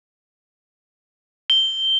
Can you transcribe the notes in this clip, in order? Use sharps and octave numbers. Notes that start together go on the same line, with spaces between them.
G7